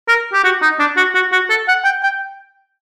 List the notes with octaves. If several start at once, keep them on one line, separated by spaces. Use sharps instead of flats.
A#4
G4
F#4
D#4
D4
F#4
F#4
F#4
A4
F#5
G5
G5